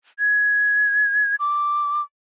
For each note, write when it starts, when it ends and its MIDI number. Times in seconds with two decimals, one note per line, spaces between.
0.19 1.35 92
1.40 2.02 86